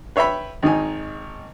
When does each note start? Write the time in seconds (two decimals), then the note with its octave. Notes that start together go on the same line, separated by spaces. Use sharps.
0.16 B4 C#5 E5 G5 B5
0.62 G#1 D#3 D#4 G#5